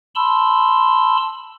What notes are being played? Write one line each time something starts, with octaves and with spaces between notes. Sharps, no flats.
A5 B5 C6 E6